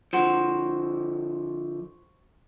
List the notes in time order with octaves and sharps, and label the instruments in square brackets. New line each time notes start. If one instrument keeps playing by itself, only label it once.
[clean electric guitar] D3 F3 [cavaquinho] F#4 C5